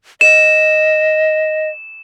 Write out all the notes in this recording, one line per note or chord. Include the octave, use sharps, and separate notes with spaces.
D#5 E7